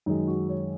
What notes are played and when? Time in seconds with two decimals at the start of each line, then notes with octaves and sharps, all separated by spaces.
0.06 F#2 D#3 G#3 D#4
0.28 F#4
0.49 C#5